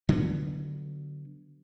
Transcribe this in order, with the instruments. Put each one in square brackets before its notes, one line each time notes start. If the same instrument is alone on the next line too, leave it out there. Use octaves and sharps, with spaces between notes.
[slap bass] D3 F#3 G#3 B3